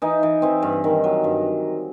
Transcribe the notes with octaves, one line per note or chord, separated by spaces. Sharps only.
E3 D#4
E3
E3 C4
G2
D#3
F#3
G2